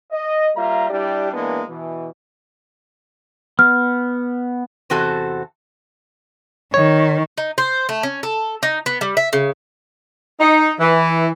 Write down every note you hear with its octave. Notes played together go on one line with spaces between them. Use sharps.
D#5
G3 A#3 F4 E5 A#5
G3 D4 E4 G4 D5
E3 G#3 A#3 B3 D4
B2 E3
B3 F6
E2 C3 C4 F#4 A4 G#5
D#3 C#5
D#4
C5
A3
C#4
A4
D#4
B3
G3
E5
C#3
D#4
E3